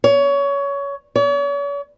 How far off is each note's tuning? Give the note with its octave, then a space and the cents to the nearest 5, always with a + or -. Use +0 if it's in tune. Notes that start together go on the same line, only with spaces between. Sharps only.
C#5 +20
C#5 +45